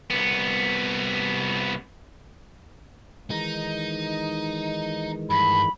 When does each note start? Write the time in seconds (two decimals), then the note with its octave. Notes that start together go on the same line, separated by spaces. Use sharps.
0.10 C2 B3
3.30 D#3 E3 G#3 D#4
5.30 G2 B5